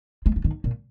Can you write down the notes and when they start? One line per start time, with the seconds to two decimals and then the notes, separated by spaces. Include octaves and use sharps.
0.26 G#3
0.36 F3
0.44 D#3
0.64 A#2